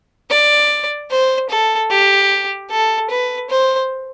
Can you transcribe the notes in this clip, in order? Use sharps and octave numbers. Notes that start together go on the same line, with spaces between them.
D5
C5
A4
G4
A4
B4
C5